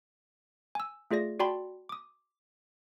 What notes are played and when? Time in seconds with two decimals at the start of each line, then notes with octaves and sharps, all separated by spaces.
0.75 G#5 E6
1.11 A3 F4 G#4 D5 A#6
1.39 F#4 D5 G5 A5 B5 C6
1.89 D6 D#6